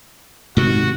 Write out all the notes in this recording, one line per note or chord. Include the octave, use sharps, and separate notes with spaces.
G#2 C3 D#3 F#4